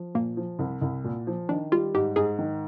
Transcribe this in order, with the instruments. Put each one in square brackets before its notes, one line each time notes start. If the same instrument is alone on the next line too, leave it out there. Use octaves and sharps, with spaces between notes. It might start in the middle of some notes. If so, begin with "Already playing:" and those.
Already playing: [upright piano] F3
[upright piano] A#2 [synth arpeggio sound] A#3
[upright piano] F3
C2
C2
A#2
F3
[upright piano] D#3 [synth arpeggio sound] D4
[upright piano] G3 [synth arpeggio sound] F4
[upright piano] G#2 [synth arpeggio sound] G4
[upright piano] G#2 [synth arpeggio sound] G#4
[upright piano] D#3